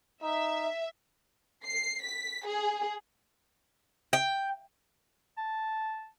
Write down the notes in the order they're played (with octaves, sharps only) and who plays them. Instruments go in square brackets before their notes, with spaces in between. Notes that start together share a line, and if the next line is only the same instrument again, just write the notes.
[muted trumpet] D#4 [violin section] E5
[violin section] C7
B6
G#4
[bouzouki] G5
[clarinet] A5